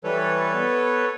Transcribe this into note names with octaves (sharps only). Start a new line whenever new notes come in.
E3 G3 A4 B4 C#5
B3